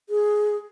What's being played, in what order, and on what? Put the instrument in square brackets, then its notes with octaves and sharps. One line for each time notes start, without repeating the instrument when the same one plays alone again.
[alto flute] G#4